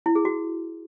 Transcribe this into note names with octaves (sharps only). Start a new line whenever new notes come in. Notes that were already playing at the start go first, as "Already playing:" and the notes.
E4
G#4
F#4